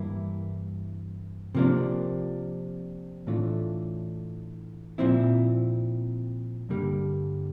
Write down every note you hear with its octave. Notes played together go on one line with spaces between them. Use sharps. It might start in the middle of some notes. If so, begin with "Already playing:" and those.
Already playing: G2 E3 A#3 E4
C3 F3 A#3 D4
A2 E3 A3 D4 F4
A#2 F3 C4 E4
G2 D3 G3 A#3